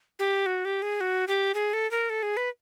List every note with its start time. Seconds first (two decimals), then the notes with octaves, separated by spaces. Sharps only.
0.19 G4
0.46 F#4
0.65 G4
0.82 G#4
1.01 F#4
1.28 G4
1.55 G#4
1.73 A4
1.91 A#4
2.10 A4
2.23 G#4
2.37 B4